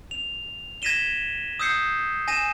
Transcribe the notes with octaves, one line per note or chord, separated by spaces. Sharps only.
F7
G#6 A#6 B6 D#7 E7 G7
D#6 E6 G6 C7 C#7
G#5 A#6 D#7 E7